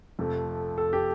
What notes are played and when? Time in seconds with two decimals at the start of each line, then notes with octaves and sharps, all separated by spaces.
0.19 F2 C3 F3 A3
0.78 A4
0.93 G4